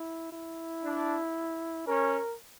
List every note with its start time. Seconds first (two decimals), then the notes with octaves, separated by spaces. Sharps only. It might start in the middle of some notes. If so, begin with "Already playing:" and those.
Already playing: E4
0.32 E4
0.83 D4
1.87 C#4 A#4